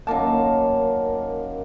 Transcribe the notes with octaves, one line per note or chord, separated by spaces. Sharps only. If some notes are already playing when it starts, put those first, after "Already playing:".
F#2 D#3 A#3 A5